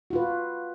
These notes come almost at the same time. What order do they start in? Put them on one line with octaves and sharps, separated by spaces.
F#4 F4 B4